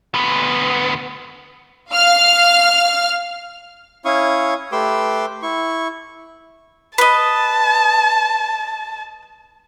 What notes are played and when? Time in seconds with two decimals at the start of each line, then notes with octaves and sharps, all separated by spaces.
0.14 D2 B3
1.92 F5 F6
4.05 C#4 E4 F5 C#6 D#6
4.72 A3 G4 B4 C6 D6 E6
5.42 E4 C#6
6.98 B4 D#5 A5